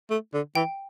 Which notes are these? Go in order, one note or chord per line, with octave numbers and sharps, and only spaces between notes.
A3
D3
E3 G5